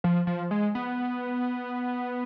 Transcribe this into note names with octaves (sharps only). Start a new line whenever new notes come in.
F3
F3
G#3
B3